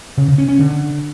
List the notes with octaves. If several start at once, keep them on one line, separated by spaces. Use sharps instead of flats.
C#3
C#3
C#4
C#4
D3